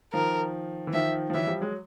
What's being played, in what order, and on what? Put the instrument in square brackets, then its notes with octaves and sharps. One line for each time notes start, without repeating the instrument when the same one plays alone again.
[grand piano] D#3 F3 [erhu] A#4
[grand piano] E3
[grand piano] D#3 F3 [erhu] E5
[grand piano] F3
[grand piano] E3 F#3 [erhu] E5
[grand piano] F3 G3
F#3 G#3